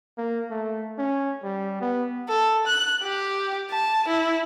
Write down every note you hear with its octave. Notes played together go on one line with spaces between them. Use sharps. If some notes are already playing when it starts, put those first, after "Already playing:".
A#3
A3
C#4
G3
B3
A4
F#6
G4
A5
E4